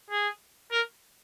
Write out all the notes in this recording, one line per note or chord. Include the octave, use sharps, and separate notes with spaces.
G#4
A#4